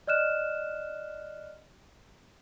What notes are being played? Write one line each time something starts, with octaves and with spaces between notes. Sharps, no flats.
D5 D#5 F6 F#6 E7